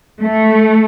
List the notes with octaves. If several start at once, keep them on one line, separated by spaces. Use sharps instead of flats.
A3